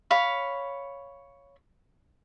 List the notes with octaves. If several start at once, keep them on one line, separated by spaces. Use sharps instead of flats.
C#5 F5 B5